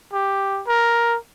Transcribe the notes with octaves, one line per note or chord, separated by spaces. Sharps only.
G4
A#4